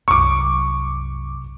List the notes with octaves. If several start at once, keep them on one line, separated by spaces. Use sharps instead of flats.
C2 F#2 C#6 D6